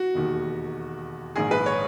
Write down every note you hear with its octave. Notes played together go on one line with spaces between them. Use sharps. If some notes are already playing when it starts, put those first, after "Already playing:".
Already playing: F#4
E1 D#2 D#3
A#1 G#2 D#3 G#4
B4
C#5